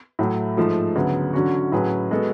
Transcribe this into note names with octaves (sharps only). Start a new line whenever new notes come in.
A2 F#3 A3
G#2 F3 A3
D2 C#3 F#3 B3
D3 F#3 C#4 F#4
A2 F#3 C#4 G#4 B4
G#3 B3 F#4 A4